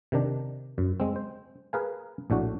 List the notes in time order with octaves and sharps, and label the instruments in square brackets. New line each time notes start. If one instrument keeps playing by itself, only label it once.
[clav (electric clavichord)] C3 D#3 D4
F#2
G#3 C4
C5
G#4 A#4 B4 F5 G#5
A#1 A2 D4 F#4